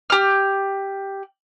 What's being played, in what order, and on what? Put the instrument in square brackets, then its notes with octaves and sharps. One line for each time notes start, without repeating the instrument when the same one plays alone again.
[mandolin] G4 F6